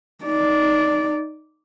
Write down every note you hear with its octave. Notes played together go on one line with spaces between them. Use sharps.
D#4 D5